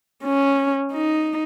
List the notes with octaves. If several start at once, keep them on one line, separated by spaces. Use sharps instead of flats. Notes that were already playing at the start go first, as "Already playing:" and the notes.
C#4
D#4